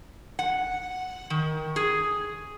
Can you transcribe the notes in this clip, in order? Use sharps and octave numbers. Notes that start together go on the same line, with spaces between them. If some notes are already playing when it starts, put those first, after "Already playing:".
F#5
D#3
G#4